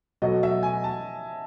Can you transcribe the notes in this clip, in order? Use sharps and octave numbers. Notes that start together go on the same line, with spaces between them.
B2 F#3 A3 D#5
E5
G#5
A5